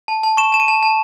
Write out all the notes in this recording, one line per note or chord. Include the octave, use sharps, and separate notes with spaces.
A5
A5
C#6 E7
A5 E7
D#7
A5
A5